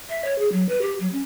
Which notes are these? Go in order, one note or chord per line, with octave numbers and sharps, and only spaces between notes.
E5
C#5
G#4
F#3
B4
G4
F#3
C#4